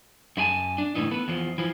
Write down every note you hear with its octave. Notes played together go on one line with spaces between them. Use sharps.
F#2 E4 G#4 G#5 A5
D4
D2 A2 C#3 E3 D#4
B3 A4 B4
E2 F3
E3 F3